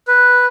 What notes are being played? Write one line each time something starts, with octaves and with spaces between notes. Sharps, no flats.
B4